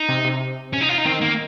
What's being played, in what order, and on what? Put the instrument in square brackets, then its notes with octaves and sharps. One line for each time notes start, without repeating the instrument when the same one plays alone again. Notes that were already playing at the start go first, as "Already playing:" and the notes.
Already playing: [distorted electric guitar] D#4
[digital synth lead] C3
C3
[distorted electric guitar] C#4
D#4
F4
D#4
[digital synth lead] D#3 [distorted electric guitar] C4
[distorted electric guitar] A#3